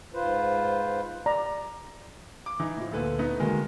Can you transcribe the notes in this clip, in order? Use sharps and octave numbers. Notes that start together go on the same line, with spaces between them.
G#2 F4 B4 C5
D5 A#5
D6
E3 D#4
A2 F3
D2 A#2 A4 B4
A3 B3 D#4
B2 D3 D#3 G#3 A#3